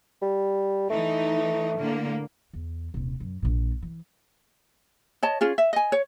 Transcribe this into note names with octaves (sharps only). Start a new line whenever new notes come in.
G3
E3 A3 D#4
A2 D3 A#3
E2
D#1 C3
F#2
A#1 A#2
E3
C#5 D#5 A5
C#4 F4 G#4
E5
D#5 G#5
C#5